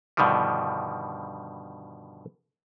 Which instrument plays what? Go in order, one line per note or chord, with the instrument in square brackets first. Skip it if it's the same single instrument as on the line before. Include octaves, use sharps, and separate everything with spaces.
[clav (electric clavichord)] G2 B2 D3 D#3 F3 G3